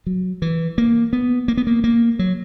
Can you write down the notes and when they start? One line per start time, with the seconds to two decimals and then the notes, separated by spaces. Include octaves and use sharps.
0.06 F#3
0.42 E3
0.78 A#3
1.13 B3
1.48 A#3
1.57 B3
1.67 A#3
1.84 A#3
2.19 F#3